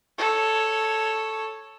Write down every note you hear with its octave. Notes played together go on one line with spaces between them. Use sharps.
A4 C#5